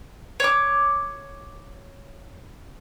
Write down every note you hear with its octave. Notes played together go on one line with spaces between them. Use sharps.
C#5 D6